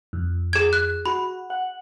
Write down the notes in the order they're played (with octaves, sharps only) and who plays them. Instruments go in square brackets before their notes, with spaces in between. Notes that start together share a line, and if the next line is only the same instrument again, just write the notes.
[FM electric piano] F2
[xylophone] G#4 G#6
F#6
[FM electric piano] F#4 [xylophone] B5
[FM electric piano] F#5